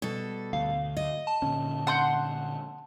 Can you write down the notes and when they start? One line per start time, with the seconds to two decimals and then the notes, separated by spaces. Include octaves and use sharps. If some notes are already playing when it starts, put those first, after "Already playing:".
0.02 B2 G3 A4
0.53 D2 F5
0.97 D#5
1.27 A5
1.42 A#2 D3 C#4
1.87 F#5 C6 G6